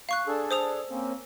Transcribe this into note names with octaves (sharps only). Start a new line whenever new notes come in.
F5 C#6 F#6
D4 G#4 A4
C5 D#6 F7
A#3 C4 C#4